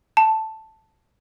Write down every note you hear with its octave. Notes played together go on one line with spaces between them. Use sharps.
A5